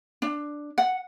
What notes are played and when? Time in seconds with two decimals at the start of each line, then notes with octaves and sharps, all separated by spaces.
0.22 D4
0.78 F#5